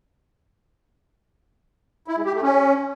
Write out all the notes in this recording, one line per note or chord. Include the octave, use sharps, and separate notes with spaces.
E4
G#3
G4
A3
C#4